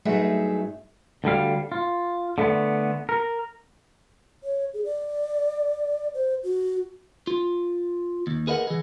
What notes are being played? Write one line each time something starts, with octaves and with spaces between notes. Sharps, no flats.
G2 F#3 A3 D#4 G#4 E5
D2 D3 G3 F5
F4
D3 A3 B3
A#4
C#5
G#4
D5
C5
F#4
F4
D#2
G#4 A#4 B4 D#5 E5 F#5
E3 G#4